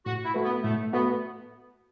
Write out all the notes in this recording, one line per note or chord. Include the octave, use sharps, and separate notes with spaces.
A2 F#4
E4
A3 F#4 B4
B3
A2 A3
A3 B3 F#4 B4